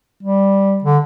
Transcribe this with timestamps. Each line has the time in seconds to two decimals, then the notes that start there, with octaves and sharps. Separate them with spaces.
0.23 G3
0.84 D3